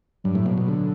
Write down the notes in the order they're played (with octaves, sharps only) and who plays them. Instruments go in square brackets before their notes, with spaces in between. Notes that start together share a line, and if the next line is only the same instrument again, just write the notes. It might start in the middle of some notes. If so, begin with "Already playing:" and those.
[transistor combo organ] G2 [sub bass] F#3
[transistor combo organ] A2
B2
B2
D3